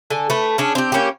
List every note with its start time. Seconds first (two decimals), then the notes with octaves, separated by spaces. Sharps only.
0.10 D3 A4 G#5
0.30 A3 B4
0.58 C#4 D4 G#4
0.75 C4 G4
0.92 A#3 C#4 E4 G4